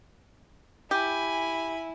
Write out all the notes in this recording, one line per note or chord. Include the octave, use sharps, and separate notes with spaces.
E4 G4 G#5 B5